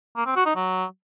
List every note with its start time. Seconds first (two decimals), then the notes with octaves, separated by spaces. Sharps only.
0.16 A#3
0.26 C4
0.36 F#4
0.46 D#4
0.56 F#3